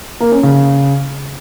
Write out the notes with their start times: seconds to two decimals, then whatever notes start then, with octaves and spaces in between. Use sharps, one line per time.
0.20 A#3
0.32 C#4
0.43 C#3